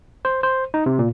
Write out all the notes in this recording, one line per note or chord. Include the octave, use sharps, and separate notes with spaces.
C5
C5
D#4
C3
A#2